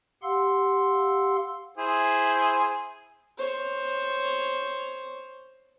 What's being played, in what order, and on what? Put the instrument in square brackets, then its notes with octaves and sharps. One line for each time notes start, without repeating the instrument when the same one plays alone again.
[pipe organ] G4 F5 F#5 C6 E6
[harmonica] E4 G#4 C5
[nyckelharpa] C5 C#5